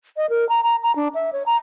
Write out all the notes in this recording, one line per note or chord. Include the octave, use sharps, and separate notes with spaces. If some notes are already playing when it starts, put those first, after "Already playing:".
D#5
A#4
A#5
A#5
A#5
D4
E5
C#5
A#5